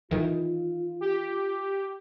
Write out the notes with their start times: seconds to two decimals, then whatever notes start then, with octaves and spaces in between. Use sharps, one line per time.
0.11 D#3 E3 F4
1.01 G4